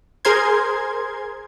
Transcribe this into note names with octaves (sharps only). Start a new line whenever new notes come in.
G#4 A#4 C5 C6 G#6